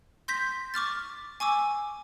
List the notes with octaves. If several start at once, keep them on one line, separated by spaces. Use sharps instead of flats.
C6 G6 A#6 B6
C#6 D6 F6 A6
G#5 C#6 D6 E6